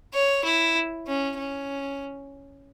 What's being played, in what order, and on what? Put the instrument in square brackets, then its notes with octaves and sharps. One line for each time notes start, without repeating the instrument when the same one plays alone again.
[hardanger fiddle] C#5
E4
C#4
C#4